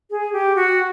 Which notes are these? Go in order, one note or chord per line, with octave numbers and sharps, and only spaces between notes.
G#4
G4
F#4